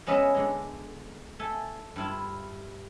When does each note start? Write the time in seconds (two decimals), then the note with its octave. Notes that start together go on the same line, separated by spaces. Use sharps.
0.07 G#3 B3 C#4 D#5 E5 A#5
0.34 D3 G#3
1.39 A3 A4 G#5
1.96 G2 E4 F4